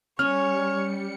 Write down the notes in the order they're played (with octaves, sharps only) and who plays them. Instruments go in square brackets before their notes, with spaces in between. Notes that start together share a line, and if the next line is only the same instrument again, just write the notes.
[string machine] G3 C#7 [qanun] C#4 [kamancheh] C#5 [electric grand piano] F6